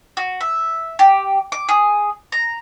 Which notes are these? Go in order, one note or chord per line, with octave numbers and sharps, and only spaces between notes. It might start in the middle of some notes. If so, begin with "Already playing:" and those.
F#4
E5
G4
D6
G#4
A#5